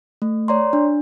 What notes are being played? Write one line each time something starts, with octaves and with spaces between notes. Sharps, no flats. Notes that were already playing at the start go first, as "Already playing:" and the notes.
A3
C#5 D5 A#5 C6
D4